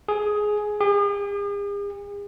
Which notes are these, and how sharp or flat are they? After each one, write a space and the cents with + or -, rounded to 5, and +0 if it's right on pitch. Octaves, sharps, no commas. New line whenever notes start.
G#4 +10
G#4 -45